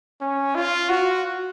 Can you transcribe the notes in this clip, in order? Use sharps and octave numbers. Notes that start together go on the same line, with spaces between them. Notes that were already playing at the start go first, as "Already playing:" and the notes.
C#4
F4
F#4